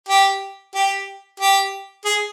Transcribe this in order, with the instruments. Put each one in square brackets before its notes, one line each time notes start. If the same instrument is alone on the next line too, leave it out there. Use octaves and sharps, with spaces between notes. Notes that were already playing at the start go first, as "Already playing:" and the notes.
[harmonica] G4
G4
G4
G#4